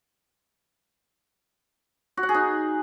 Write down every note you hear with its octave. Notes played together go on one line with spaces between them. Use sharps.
F#4
F#5
G#4
D#4